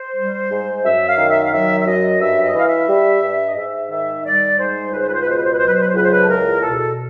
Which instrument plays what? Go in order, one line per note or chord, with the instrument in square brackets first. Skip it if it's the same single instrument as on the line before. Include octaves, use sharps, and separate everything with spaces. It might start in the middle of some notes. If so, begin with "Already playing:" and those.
Already playing: [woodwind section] C5
G3
G#2
F#2 E5
F5
D#3
E5
F5
F#3 E5
E5
F#2 D#5
G2 E5
D#5
E3 F5
E5
G3
G2
D#5
G#2 E5
D#3 E5
G3 D5
G#2 C5
C#2 B4
C5
B4
C5
B4
B2 C5
B4
C5
B4
F#3 C5
B4
C5
B4
C5
C#2 B4
C5
B4
A4
E2 A#4
B2 A4